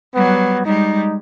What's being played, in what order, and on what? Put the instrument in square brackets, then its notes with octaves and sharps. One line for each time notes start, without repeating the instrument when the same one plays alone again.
[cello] F#3 G3 [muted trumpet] B3
[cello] G3 G#3 [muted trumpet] D#4